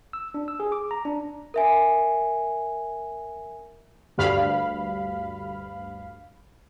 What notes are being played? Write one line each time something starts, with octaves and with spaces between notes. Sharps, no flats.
E6
D4
E6
G#4
D6
A#5
D4
A#4 E5 G#5
D2 G2 F5 B5